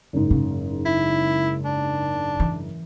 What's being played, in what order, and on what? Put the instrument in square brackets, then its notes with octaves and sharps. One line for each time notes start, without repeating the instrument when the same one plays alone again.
[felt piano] F#1 G#2
[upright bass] C#3
[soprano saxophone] E4
D4
[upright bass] E3